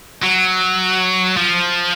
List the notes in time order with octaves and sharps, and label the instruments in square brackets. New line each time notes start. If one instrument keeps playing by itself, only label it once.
[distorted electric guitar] F#3
F3